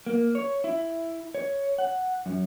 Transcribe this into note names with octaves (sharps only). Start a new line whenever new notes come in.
A#3
C#5
E4
C#5
F#5
F#2